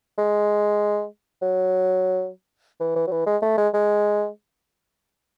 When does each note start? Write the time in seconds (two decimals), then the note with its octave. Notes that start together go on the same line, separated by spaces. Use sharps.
0.18 G#3
1.42 F#3
2.80 E3
2.96 E3
3.07 F#3
3.11 E3
3.26 G#3
3.42 A3
3.58 G#3
3.74 G#3